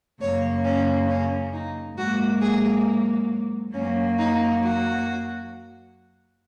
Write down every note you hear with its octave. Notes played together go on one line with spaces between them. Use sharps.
F#2 C#3 A#3 C#5
C#4
C#4
D#4
G#2 F#3 A#3 F#4
G#4
F#2 F#3 A#3 C#4
D#4
F#4